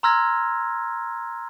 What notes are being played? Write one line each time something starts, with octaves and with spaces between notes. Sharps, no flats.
A#5 C6 E6 F6 G#6 A#6